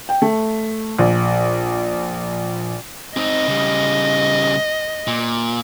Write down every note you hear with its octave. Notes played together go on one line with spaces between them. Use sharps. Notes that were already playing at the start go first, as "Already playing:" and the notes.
G5
A3
A#1
C4 D#4 D#5
C#3 G3
A#2